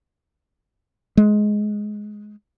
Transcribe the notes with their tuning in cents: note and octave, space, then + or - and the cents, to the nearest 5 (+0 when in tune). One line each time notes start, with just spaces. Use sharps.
G#3 +10